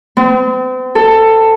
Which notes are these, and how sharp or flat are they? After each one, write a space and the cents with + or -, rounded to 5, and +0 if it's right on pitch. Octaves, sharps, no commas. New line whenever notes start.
C4 -40
A4 +15